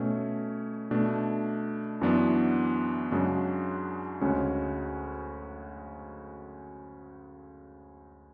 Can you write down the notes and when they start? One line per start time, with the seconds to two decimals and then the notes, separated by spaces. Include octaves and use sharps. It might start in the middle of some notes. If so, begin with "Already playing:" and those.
Already playing: B2 A3 C#4
0.91 B2 A3 D4
2.01 F#2 E3 B3 D4 F#4
3.12 F#2 C#3 G#3 D4 F#4
4.21 D2 C#3 G#3 C#4 F#4